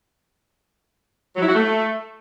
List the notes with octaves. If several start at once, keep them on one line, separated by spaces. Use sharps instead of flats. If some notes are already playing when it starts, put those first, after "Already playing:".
F#3
E4
F#4
A3